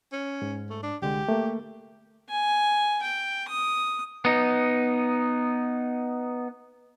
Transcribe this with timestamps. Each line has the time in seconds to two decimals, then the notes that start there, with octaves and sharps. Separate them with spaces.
0.12 C#4
0.42 G#2
0.70 A3
0.83 D4
1.02 C2 D3 G#3 G4
1.29 A3 A#3
2.30 G#5
3.02 G5
3.48 D#6
4.25 B3 D#4